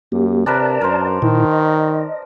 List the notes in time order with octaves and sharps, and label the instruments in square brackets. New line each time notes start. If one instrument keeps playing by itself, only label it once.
[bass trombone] F#2 [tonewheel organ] A#3 G4
[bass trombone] C3 [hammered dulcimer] D4 A#4 B4 [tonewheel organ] D5 A5
[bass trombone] F#2 [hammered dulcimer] A#4 C5
[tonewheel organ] A#2 E4 [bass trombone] D#3
[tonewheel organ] D#5